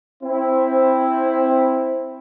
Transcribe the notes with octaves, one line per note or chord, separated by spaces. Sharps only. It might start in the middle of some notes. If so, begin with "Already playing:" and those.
C4 E4